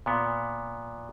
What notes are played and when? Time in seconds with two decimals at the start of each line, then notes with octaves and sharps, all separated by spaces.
0.06 A#2 B3